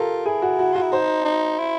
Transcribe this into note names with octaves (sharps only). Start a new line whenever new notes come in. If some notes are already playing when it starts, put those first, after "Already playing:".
Already playing: F4 G4 A4 A#4
E4 G#4
F#4
F#4
F4 F#4
E4
D#4 C5
D#4
E4